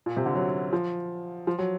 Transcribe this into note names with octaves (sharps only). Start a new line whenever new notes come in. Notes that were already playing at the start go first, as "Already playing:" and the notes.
A#2
C3
D3
F#3
F3
F3
F#3